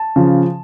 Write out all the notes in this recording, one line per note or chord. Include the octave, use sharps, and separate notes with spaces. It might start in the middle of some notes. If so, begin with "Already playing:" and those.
Already playing: A5
C#3 F3